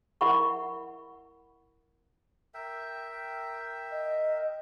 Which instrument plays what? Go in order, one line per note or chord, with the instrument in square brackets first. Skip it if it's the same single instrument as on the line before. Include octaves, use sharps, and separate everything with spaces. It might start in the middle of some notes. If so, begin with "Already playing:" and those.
[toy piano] E4 A#4 E5 F#5 B5 C#6
[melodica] A#4 E5 G5
[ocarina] D#5